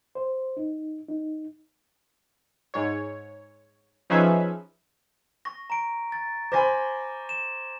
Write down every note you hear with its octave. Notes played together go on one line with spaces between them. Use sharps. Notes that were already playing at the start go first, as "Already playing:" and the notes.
C5
D#4
D#4
G#2 C#5
F3 C#4 D#4 G#4 B4 E5
C#6 A#6
A#5 D7
A6
C5 G#5 B5 D6 A#6
E7